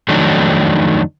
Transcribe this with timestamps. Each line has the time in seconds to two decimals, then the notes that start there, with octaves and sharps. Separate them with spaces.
0.08 F2 D#3 F#3 A3 D4 D#4